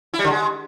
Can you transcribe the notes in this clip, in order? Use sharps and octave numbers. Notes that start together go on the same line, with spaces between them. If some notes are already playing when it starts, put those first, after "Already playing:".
E4
G3
D3
G#3